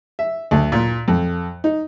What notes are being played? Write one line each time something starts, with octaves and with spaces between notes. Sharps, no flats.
E5
D2
A#2
F2
D#4